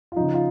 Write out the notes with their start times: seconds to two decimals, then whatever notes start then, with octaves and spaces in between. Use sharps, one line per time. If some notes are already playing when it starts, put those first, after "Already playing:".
0.12 F4
0.16 C#3 F3 D#4
0.34 F4